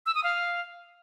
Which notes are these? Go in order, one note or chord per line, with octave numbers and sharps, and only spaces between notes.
E6
D#6
F5